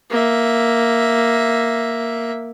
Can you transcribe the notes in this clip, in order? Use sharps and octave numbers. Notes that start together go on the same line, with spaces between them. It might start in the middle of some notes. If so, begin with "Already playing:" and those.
A#3 E5